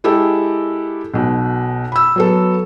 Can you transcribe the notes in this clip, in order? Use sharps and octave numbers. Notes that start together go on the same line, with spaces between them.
G#3 E4 G4 A4
B1 B2
B5 E6
F#3 B3 A4